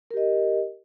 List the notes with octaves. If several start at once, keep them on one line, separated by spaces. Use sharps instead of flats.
G4 A#4 D#5